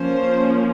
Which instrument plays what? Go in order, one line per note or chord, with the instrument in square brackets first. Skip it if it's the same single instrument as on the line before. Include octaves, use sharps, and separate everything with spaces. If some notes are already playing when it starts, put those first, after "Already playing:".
Already playing: [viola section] F3 A#3 C#4 C5